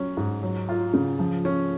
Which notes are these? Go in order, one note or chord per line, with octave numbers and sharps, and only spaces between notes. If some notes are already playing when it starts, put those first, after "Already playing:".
Already playing: F#3 C#4
G#2
F#3
F4
C#3
F3
C#4